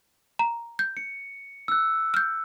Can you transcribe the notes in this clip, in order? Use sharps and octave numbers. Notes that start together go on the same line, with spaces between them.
A#5
G6
C#7
E6 F#6
F6 G6